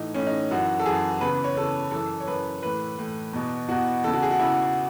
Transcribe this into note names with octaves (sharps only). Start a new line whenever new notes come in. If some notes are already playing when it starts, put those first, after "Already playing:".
Already playing: A2 E3 D#4
A2 E3 C#4
D#4
F#2 E3 F#4
A4
F#2 E3 G#4
E2 C#3 E3 B4
C#5
E2 C#3 E3 A4
F#2 E3 A4
C#5
F#2 E3 B4
A2 E3 B4
A2 E3
E2 B2
E2 B2 F#4
E2 C#3 E3 A4
F#4
G#4
F#4
E2 C#3 E3 E4